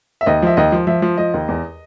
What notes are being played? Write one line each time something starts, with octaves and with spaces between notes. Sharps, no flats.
E5
D#2 D#5
F3 E5
D#2 D#5
F3
F3 E5
F3
F3 D#5
D#2
E2